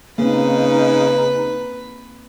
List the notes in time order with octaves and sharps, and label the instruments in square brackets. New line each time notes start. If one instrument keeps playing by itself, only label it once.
[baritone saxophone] C#3 [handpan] A#3 C4 [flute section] D#4 [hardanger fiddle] B4